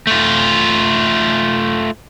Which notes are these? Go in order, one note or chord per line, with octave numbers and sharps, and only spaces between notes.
A3 F4